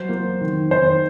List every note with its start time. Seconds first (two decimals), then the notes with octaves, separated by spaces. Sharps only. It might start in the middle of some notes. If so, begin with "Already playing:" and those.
Already playing: F#3 C5
0.09 A#3
0.41 D#3
0.71 D#3 C5